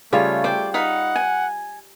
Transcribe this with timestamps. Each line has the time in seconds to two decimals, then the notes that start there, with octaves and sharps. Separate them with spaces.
0.13 C#3 G3 A3 F4 C#5
0.44 C5 D5 G5
0.74 D#4 F5 F#5 B5
1.16 G#5